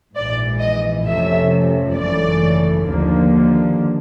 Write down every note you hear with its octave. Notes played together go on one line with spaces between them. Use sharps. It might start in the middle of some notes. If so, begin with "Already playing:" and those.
A#1 G#2 E3 D5
D#5
F2 C3 F3 A3 C#4 E5
G#1 F#2 C#3 E3 A3 D5
D#2 D3 F3 A#3